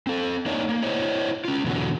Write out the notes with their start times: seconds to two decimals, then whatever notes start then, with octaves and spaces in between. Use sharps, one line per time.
0.07 C4 A4
0.46 A#3 D4 D#4 C#5 D#5
0.69 A#3
0.83 E4 C5 C#5 D#5
1.45 C#4 F4
1.65 E2 B2 D3 F#3